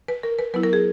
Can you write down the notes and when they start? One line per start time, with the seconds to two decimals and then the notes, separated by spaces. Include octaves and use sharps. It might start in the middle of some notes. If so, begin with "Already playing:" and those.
0.08 B4
0.23 A#4
0.39 B4
0.54 F#3 B3 E4 B4
0.63 A#4
0.73 G#4